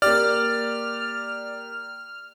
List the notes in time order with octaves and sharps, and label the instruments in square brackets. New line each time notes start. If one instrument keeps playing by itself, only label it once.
[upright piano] A#3 G4 [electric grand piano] D5 [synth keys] F6